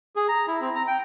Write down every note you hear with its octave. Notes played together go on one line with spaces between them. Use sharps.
G#4
A#5
E4
C4
A#5
G5